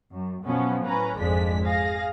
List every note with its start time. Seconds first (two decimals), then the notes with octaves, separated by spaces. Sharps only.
0.12 F#2
0.44 F#2 B2 F3 B3 C#4
0.83 A2 C#4 B4 A#5
1.17 G#1 F2 G#3 D4 B6
1.64 G#4 F5 A#6